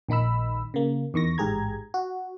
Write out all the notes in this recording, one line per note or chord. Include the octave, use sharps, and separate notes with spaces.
A#1 D#3 D#4 B5 E6
C#3 A#3
E2 D#3 C#6 A#6
A1 G#2 G4 G#4 A#5 G#6
F#4